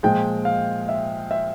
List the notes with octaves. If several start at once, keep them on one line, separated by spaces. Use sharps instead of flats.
A#2 F3 G#3 G5
F5
E5
E5